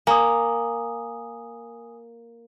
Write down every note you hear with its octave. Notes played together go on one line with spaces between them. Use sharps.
A#3 G#5 D#6